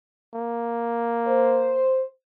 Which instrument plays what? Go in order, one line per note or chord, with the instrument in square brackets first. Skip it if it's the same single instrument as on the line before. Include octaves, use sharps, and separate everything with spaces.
[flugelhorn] A#3
[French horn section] C5